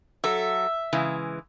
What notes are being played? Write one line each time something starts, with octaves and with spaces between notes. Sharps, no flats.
F#3 A4 E5
C#3 E3 G#3